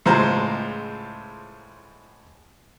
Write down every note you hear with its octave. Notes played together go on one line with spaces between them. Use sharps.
C#2 A2 G#3 F4 C5 A#5